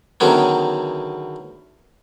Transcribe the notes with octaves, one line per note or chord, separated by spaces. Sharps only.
E2 D3 D#3 F#3 B3 C#4